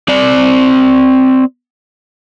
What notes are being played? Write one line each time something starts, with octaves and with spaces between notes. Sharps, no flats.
C4 D5